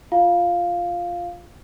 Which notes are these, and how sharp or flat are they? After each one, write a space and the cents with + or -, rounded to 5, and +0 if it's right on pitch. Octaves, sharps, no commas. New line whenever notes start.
F4 +0 F5 +0